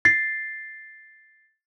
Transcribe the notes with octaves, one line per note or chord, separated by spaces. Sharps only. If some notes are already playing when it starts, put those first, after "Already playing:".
A6 C7